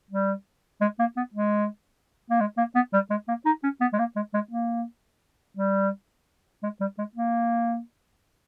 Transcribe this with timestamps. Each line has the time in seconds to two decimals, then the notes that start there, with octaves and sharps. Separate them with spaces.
0.11 G3
0.81 G#3
0.99 A#3
1.17 B3
1.34 G#3
2.30 A#3
2.40 G#3
2.58 A#3
2.75 B3
2.93 G3
3.11 G#3
3.28 A#3
3.46 D#4
3.63 C#4
3.81 B3
3.93 G#3
3.99 A#3
4.16 G#3
4.34 G#3
4.51 A#3
5.57 G3
6.63 G#3
6.80 G3
6.98 G#3
7.15 A#3